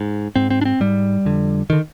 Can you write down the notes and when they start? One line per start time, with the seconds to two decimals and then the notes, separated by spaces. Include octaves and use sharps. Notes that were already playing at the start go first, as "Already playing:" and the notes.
Already playing: G#2
0.36 G#2 C4
0.50 C4
0.61 D4
0.65 C4
0.80 G#2 G3
1.25 F2 D3
1.70 D3 D#3